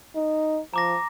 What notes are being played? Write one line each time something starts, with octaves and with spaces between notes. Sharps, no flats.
D#4
F3 A#5 D6 A#6